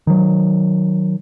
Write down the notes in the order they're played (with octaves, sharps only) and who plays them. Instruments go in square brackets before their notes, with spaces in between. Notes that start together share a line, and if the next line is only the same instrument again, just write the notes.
[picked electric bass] D#3 F#3